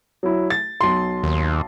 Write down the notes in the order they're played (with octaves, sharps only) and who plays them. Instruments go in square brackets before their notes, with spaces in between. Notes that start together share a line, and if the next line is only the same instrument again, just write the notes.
[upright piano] F#3 E4
A6
B1 C6
[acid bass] D#2